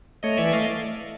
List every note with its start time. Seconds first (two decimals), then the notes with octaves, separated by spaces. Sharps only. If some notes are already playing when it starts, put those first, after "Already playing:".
0.23 A3 C#5 D#5
0.37 E3 D5 E5
0.53 A3 D#5 F5